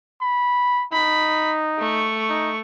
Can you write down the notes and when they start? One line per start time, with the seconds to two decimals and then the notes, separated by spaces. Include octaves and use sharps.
0.22 B5
0.93 D#4 B5
1.79 A3 C#6
2.30 D#4